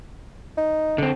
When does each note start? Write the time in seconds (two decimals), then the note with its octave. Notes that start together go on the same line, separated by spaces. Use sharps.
0.58 D#4
0.98 D3 C4